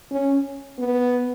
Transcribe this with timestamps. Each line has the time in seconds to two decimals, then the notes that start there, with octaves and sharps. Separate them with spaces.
0.11 C#4
0.79 B3